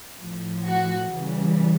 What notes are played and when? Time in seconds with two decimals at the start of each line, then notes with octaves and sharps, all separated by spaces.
0.20 A2 F3
0.66 F#4
1.12 C#3 E3 G3